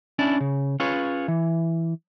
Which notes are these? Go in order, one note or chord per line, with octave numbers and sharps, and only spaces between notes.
C#4 D4 E4 D5
C#3
C#4 F4 G#4 B4 C#5
E3